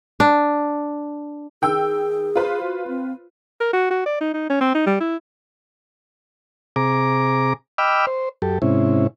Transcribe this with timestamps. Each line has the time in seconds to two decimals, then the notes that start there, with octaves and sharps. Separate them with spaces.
0.20 D4
1.62 D#3 G#4 G5 E6
2.35 F4 B4 C5
2.63 F#4
2.88 C4
3.60 A#4
3.73 F#4
3.90 F#4
4.06 D5
4.21 D#4
4.34 D#4
4.50 C#4
4.61 C4
4.75 D#4
4.87 G3
5.00 E4
6.76 C3 G#4 A#5 D6
7.78 D#5 G5 B5 D6 E6 F6
8.07 C5
8.42 F#2 G4 A4
8.62 G#2 C3 C#4 E4